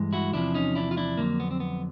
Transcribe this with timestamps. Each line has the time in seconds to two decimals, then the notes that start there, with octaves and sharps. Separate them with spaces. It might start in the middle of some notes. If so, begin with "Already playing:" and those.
Already playing: G2 E3 G#3
0.13 E4 F#4
0.33 E2 C3 F3 D4 E4
0.54 C#4 D#4
0.75 D4 E4
0.91 F4
0.97 D4 E4
1.17 F2 D3 F#3 A#3
1.40 B3
1.51 C4
1.60 B3